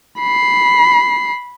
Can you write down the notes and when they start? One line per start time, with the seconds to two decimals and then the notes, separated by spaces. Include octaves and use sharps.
0.18 B5 C7